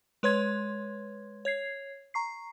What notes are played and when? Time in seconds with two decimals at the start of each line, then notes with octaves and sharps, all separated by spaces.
0.23 G#3 B4 C#5 C6 G#6
1.45 C#5 G#6 C7
2.14 A#5 C#6 C7